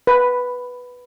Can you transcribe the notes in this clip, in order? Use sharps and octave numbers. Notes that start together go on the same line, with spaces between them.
B4